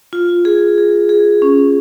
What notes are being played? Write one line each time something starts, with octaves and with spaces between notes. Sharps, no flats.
F4
G#4
G#4
G#4
C#4